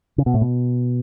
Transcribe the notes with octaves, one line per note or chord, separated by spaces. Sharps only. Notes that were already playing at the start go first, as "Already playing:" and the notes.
C#3
B2
A2
B2